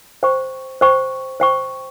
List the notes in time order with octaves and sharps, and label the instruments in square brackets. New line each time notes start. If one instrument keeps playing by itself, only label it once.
[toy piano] C5 G5 C#6
C5 G5 C#6
C5 G5 C#6